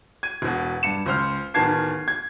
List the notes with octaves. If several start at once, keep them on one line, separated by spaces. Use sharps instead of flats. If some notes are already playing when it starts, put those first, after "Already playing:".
G#6 D#7
E1 B2
G2 C#7 E7
C#2 C5 F6
D1 D#3 B3 A5 G#6 C7
G#6